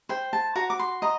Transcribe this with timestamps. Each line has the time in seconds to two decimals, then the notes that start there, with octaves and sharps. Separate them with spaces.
0.09 C5 G5
0.33 A5
0.56 F#4 A#5
0.70 D6
0.79 C6
1.02 D#5 A#5